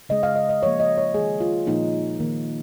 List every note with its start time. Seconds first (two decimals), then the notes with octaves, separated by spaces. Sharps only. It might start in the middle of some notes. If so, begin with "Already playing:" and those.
0.09 C#3 G#3 D#5
0.23 F5
0.36 D#5
0.49 D#5
0.62 C#3 F3 A#3 C#5
0.80 D#5
0.98 C#5
1.14 D#3 G#3 G#4
1.41 F4
1.67 A#2 F3 A#3 D#4
2.20 D#3 A#3